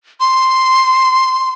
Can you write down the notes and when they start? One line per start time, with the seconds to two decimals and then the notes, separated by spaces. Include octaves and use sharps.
0.20 C6